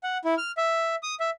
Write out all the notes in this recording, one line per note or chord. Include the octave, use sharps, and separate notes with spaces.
F#5
E4
F6
E5
D#6
E5